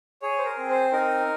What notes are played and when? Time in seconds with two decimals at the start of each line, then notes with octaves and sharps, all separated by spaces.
0.22 G#4 C#5
0.38 C5
0.45 A#4
0.58 C4
0.69 C5
0.92 D#4 A#4